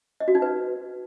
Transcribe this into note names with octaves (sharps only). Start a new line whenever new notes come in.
D#5
F#4
D#4
B4